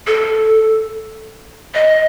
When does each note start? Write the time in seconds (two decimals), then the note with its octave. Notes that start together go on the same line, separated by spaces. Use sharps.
0.07 A4
1.74 D#5